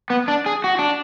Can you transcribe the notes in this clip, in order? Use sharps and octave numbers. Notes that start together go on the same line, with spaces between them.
B3
D4
G#4
F#4
D4